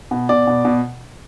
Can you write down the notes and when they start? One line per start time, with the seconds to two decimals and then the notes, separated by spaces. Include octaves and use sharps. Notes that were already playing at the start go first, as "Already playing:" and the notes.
0.11 B2
0.29 B2 D5
0.47 B2
0.65 B2